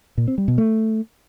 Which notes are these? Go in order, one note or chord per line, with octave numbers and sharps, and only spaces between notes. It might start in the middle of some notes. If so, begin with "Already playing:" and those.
A#2
C4
G3
B2
A3